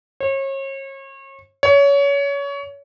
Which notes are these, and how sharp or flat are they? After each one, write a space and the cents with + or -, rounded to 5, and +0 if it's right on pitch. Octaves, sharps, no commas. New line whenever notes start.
C#5 -35
C#5 +25